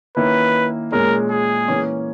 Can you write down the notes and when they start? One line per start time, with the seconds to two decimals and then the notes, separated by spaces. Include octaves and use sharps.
0.17 D#3 A#3 C#4 E4 B4
0.92 A#2 G#3 C#4 A#4
1.30 G#4
1.68 E3 A#3 C#4